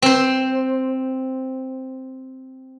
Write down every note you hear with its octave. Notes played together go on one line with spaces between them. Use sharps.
C4 C5